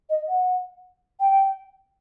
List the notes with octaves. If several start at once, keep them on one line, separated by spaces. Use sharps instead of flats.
D#5
F#5
G5